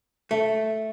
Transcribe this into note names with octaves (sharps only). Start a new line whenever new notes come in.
A3